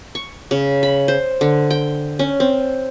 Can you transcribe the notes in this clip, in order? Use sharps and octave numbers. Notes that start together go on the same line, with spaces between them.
C#6
C#3
B5
C5
D3
G5
C#4
C4